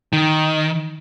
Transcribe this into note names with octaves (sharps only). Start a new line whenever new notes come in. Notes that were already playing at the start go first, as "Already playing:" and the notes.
D#3